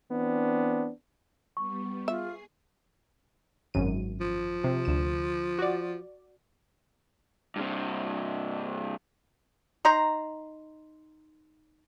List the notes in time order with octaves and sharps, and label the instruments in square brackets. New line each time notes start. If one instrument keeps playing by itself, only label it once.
[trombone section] E3 B3 C4 D4
[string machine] G3 B3 [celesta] C#6
[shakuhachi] F4 [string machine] G#4 C7 [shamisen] E5
[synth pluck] G#1 F#2 D#7
[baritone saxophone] F3
[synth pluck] C3
D2 E7
F#4 D5
[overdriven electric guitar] G2 C3
[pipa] D#4 A#5 C6